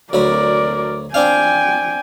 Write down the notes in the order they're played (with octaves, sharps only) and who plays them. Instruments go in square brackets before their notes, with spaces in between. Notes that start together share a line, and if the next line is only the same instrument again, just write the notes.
[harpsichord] D2 F#3 B5 [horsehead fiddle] A#4 D5
[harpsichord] C4 D4 F5 [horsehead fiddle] G5 G#5